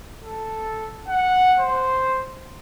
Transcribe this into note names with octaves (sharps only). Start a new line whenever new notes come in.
A4
F#5
C5